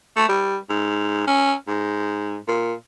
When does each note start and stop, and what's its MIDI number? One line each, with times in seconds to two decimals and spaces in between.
0.16 0.25 57
0.29 0.57 55
0.70 1.26 44
1.27 1.53 61
1.68 2.37 44
2.48 2.73 46